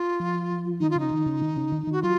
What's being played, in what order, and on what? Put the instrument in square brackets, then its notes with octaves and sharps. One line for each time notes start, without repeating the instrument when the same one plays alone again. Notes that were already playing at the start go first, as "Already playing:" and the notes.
Already playing: [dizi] F4
[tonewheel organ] F3
[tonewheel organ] D#3 [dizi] D#4
[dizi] F4
[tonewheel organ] C#3 [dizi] D#4
[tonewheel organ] D#3
C#3
D#3
C#3
D#3
D#3
[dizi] F#4
[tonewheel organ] F#3 [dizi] F4